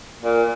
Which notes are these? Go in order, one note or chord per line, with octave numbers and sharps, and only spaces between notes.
A#2